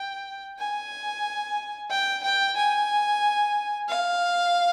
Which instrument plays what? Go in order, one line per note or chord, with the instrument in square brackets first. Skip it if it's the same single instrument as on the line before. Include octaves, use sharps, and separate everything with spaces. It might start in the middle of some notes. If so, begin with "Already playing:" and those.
Already playing: [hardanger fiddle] G5
G#5
G5
G5
G#5
F5